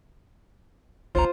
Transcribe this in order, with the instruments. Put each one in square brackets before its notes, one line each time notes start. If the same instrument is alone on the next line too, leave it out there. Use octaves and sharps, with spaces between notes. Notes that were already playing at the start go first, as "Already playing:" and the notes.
[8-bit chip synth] G1 C#2 A#5 [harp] F4 C5